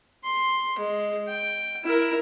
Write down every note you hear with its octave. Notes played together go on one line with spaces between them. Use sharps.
C6
G#3
G5
E4 A#4